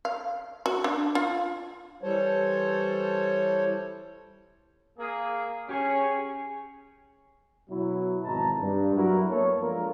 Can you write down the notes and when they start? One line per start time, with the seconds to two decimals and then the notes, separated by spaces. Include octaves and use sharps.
0.05 F5
0.66 F#4
0.84 D4
1.15 F4
2.03 E3 G3 A4 C5 C#5
4.99 A#3 G#4
5.69 C#4 G4 G#4 C#5
7.70 B2 F#3 E4
8.23 G#1 E2 B2 A5 A#5
8.61 G2
8.96 F#3 B3 E4 F#4 A#4
9.30 A#3 B3 A4 A#4 C#5
9.61 F3 G#3 D4 F4 A#4